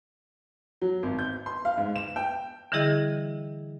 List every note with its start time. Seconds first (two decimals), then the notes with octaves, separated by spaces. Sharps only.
0.82 F#3
1.03 G#1
1.19 G6
1.46 C6
1.65 F5
1.78 G#2
1.96 E7
2.16 G5
2.72 D3 E3 G3 E4 G#4 D#5